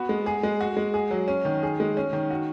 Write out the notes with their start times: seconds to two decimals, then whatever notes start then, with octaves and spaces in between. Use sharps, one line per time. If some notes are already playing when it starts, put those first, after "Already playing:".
Already playing: B3 F#4
0.09 G#3
0.26 G#4
0.43 G#3
0.61 F#4
0.77 G#3
0.94 G#4
1.11 F#3
1.28 C#4
1.45 D#3
1.63 G#4
1.80 G#3
1.97 C#4
2.13 D#3
2.30 F#4